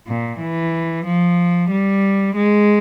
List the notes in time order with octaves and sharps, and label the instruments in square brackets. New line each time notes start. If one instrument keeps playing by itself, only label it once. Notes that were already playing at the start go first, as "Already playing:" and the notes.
[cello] A#2
E3
F3
G3
G#3